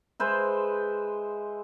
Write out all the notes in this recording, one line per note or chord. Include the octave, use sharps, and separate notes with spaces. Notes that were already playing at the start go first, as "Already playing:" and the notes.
G#3 B4 C5 E5